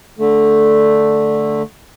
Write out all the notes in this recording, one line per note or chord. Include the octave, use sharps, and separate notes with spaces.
D3 A3